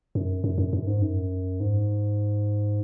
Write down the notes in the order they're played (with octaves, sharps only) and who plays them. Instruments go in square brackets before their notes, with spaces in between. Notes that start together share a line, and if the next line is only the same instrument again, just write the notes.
[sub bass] F#2
F#2
F#2
F#2
G#2
F#2
G#2